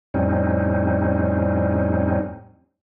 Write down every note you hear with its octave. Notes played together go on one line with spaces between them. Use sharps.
F2 A2 G3 C4 C#4 D#4